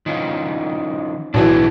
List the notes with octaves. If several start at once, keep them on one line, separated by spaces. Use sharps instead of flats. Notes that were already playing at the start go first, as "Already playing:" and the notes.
D#3 F3 C#4
B1 E3 D4 F#4 G#4